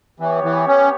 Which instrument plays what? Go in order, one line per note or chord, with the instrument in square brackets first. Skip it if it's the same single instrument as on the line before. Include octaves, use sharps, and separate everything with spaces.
[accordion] E3 [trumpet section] B3 G4 C#5
[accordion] E3
C#4